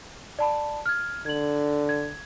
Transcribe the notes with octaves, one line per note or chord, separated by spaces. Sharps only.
D5 A5 B5
F6 G#6
D3 G#6 F#7
G#6